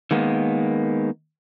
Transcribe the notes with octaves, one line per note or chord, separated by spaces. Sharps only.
D#3 G#3 A#3 B3